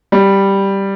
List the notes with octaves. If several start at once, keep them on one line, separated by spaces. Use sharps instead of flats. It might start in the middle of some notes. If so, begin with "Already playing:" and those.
G3